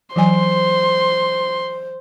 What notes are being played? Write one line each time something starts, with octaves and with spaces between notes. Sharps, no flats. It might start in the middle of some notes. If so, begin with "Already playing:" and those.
E3 F#3 C5 G#5 C6